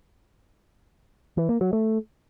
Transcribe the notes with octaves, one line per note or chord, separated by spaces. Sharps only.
E3
A#3
F#3
A3